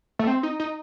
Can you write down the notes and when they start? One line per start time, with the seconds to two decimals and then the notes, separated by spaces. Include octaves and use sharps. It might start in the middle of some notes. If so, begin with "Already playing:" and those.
0.19 A3
0.27 C4
0.43 D#4
0.60 D#4